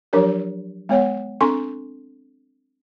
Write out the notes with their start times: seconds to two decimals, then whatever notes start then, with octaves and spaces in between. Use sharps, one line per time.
0.13 F3 F#3 D4 G4 A#4 C#5
0.89 G#3 B3 C#5 F#5
1.41 C4 D4 A4 C6 C#6